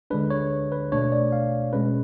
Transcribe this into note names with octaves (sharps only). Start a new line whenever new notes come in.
D3 G#3 D4 B4
C#5
B4
B2 A3 D4 C#5
D5
F5
B2 G#3 C#4 B4